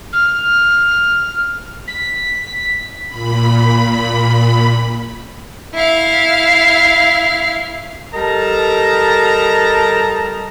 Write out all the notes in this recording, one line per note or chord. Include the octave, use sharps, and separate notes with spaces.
F6
B6
A#2 B5
E4 F5
G3 A4 A#4 D#5 A5 A#5